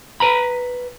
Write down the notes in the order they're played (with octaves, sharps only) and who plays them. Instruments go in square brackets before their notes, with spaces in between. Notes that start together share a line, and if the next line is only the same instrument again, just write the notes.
[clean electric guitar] B4 A#5 B5